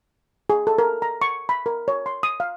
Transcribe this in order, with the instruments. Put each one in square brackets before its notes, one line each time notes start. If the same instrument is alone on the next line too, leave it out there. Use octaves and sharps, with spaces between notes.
[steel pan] G#4
A4
A#4
A#5
C#6
B5
A#4
C#5
C6
D#6
F5